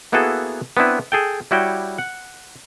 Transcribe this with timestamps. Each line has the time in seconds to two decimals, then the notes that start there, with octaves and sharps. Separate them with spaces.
0.12 A#3 B3 E4 F#4 G#4 A4
0.77 B3 C4 D4 E4 B4
1.12 G#4 A4 G5
1.51 G3 E4 F#4 C#5 G5
1.98 F#5